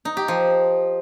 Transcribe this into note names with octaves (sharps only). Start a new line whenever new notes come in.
D#4
G4
F3